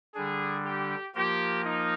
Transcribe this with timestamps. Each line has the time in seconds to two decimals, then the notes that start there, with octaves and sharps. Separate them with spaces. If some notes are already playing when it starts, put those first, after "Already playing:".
0.15 D3 G3 D4 G#4
0.65 G4
1.15 F3 A#3 F4 G4 A#4
1.65 D#4